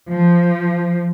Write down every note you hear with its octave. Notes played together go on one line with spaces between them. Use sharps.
F3